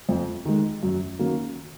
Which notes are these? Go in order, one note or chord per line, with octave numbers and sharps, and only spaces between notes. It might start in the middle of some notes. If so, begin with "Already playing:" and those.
F2
D#3 G#3
F#2
D#3 F#3 A#3 C#4